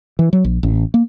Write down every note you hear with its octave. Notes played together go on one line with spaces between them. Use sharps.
E3
F#3
A#1
A1
A#3